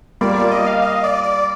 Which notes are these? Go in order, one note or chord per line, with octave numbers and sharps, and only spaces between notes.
G3 A#3 F4 D5
D5
D#5
F5
D#5
D5
D5